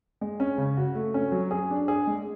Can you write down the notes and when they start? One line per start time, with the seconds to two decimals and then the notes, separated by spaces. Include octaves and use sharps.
0.21 G#3
0.40 C#4
0.58 C#3
0.77 F#4
0.95 A3
1.14 C#4
1.32 F#3
1.51 G#4
1.70 D4
1.88 G#4
2.07 G#3